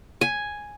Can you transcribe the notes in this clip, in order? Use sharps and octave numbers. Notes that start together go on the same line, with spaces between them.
G#5